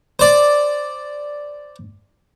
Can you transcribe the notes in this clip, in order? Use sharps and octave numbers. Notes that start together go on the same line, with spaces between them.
C5 D5